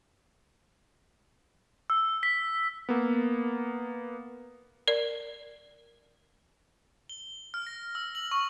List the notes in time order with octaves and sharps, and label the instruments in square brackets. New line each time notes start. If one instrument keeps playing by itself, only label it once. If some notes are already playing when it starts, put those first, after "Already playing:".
[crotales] E6
B6
[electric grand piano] A#3 B3
[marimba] A#4 D5
[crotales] G7
F6
A#6
E6
F#7
C#6